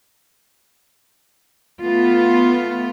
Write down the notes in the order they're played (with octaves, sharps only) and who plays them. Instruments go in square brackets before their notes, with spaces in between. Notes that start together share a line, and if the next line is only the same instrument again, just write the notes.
[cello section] A3 B3 F4